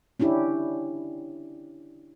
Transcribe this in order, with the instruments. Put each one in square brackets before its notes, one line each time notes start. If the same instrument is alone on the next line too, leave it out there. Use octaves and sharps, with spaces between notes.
[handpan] C#4 D4 E4 G4